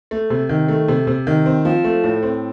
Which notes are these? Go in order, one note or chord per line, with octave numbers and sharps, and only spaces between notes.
A3
C3
D#3
A3
C3
C3
D#3
C4
F3
A3
A2
C4